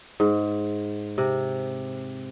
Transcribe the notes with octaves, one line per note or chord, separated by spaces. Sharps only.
G#2
C3